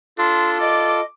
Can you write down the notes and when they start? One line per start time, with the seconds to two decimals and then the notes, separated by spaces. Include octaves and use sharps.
0.18 D4 F4 A4 C6
0.60 D5 D#5 D6